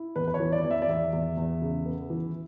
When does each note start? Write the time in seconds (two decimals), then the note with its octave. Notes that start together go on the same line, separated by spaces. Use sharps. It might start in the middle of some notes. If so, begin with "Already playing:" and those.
Already playing: E4
0.16 E2 B4
0.28 B4
0.34 C#5
0.40 E3
0.52 D5
0.64 E2
0.71 E5
0.82 D5
0.89 E2 E5
1.13 E2
1.37 E2
1.62 C#3
1.86 B3
2.10 E3